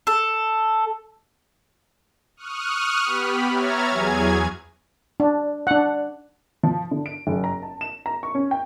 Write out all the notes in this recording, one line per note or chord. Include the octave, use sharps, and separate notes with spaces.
A4
C#6 D#6 F6 F#6
B3 G4 B5
C#5 E5 A#5 F6 G#6 A6
E2 F#3 G#4 G#5 G#6
D4
D4 F#5
F3
D3
D7
F#1
A#5
A5
E7
A#5
C#6
C#4
G5